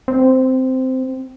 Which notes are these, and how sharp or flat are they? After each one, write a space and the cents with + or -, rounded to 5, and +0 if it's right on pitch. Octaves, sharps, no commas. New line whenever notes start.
C4 -10